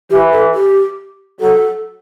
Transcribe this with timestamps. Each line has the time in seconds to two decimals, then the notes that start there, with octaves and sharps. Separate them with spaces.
0.10 E3 G4
0.33 A4
0.54 G4
1.40 F#3 A4